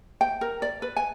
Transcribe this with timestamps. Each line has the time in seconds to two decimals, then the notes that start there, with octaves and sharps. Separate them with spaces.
0.21 G5
0.41 A#4
0.62 D5
0.82 B4
0.97 G#5